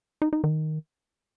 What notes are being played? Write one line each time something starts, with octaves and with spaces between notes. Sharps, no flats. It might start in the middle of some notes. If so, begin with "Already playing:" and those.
D#4
D#4
D#3